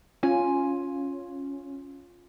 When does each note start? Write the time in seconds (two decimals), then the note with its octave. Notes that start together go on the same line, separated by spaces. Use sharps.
0.23 C#4 F4 G#5